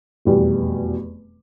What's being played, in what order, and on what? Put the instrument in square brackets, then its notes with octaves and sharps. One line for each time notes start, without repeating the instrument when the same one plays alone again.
[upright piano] F1 E2 B2 G3